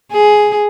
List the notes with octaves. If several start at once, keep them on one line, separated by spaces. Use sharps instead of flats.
G#4